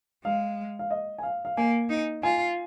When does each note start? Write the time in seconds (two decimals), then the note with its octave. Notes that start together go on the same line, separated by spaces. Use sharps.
0.24 G#3 F5
0.79 F5
0.90 D#5
1.18 G#5
1.23 F5
1.45 F5
1.57 A#3 G#5
1.90 D#4
2.23 F4 G#5